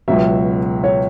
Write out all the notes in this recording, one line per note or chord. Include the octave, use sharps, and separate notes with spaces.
C#2 B2 F#3 E5
C#5